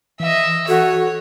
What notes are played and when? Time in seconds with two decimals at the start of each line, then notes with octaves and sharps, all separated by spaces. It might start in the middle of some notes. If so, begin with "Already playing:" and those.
0.20 E3 D#5 E5
0.68 F#4 A4 C#5